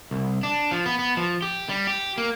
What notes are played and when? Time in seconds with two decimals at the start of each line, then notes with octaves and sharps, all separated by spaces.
0.11 C2
0.43 D4
0.71 F3
0.86 B3
0.99 B3
1.17 F3
1.42 G4
1.69 G3
1.87 G4
2.18 A#3